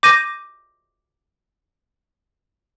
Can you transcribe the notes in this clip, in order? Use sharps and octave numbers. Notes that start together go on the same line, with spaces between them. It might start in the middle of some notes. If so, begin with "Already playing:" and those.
D6 G6 A#6 D#7